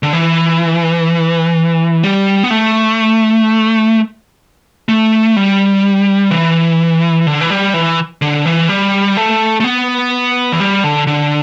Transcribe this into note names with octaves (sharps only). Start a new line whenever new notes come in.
D3
E3
G3
B3
A3
A3
G3
E3
D3
E3
G3
E3
D3
E3
G3
A3
A3
B3
E3
G3
D3
D3